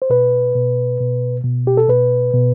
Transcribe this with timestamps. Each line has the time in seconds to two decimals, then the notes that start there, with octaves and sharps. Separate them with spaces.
0.02 C5
0.10 B2 B4
0.55 B2
1.00 B2
1.44 B2
1.67 G4
1.77 A4
1.89 B2 B4
2.34 B2